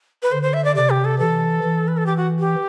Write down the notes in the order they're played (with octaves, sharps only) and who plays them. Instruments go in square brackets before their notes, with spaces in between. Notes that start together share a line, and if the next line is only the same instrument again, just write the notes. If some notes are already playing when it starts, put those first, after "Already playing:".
[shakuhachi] B4
[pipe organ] D3 [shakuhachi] C5
[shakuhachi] C5
E5
D5
[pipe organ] C3 [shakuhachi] D5
[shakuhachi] G4
A4
[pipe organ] E3 [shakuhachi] A4
[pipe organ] E3
[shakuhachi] B4
A4
G4
F#4
G4